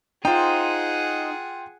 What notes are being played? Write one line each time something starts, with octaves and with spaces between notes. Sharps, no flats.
D#4 F4 G#4 C5 F#5 G5